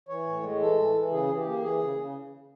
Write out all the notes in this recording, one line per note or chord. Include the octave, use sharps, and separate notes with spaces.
E3 C#5
A2
G#3
E3 A4
E3
E3
C#3 G#4
E3
G4
A#3
E3 G#4
C#3
C#3